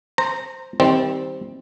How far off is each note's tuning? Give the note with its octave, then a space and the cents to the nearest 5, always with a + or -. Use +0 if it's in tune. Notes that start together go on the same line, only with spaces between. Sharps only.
C5 +0 A#5 -20
D#3 +35 G3 +0 C4 +0